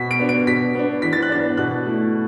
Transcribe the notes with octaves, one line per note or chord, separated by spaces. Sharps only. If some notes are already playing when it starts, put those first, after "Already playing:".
Already playing: B2 B6
D7
B3 D4
D7
B2 B6
B3 D4
E3 B6
A6
F#6
B3 D4 A6
B2 F#6
A3 E4